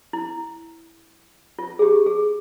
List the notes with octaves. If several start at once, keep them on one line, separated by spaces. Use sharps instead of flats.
E4
F4
G#4
G4
G#4